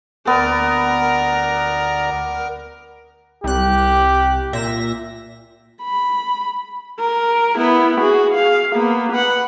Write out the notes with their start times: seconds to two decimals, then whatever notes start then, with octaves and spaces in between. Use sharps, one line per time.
0.27 D2 B3 A#4 D5 A#5
3.44 C2 G4 F#6
4.53 A#2 E5 A#6
5.83 B5
7.00 A#4
7.58 B3 E4
8.00 F#4 G#4
8.34 G#4 F5
8.73 A#3 B3
9.13 B4 F#5